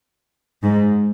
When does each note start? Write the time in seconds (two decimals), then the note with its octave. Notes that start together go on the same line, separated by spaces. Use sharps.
0.63 G#2